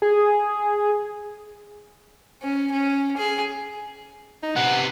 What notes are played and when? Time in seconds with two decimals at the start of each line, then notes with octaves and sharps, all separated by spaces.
0.02 G#4
2.42 C#4
2.72 C#4
3.17 G#4
4.43 D#4
4.56 C3 B3 F#5